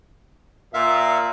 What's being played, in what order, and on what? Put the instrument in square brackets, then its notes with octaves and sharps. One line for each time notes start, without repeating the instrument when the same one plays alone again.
[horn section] A#2 [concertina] E5 F5